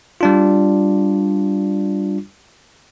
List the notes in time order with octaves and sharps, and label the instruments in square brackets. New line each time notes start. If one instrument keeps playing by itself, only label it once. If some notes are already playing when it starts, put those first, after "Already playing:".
[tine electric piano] G3 D4 F4